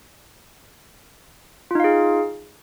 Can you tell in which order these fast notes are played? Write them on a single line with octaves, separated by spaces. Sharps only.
F4 D#4 F5 G#4